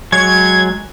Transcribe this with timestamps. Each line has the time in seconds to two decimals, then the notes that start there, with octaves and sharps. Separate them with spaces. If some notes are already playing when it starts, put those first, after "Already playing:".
0.12 F#3 G#3 C#5 G#6